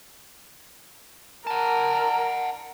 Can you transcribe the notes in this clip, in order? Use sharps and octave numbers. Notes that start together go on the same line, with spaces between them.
A#4 F#5 A5